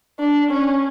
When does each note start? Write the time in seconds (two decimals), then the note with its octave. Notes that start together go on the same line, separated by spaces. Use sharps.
0.20 D4
0.50 C#4